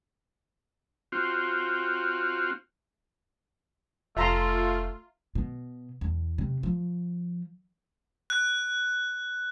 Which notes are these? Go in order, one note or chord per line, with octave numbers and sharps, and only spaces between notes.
C4 F4 F#4
F1 A3 F4 E5 A#5 C6
B2
E2
C3
F3
F#6